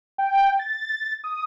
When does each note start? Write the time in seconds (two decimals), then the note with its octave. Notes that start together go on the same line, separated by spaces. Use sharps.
0.18 G5
0.59 A6
1.24 D#6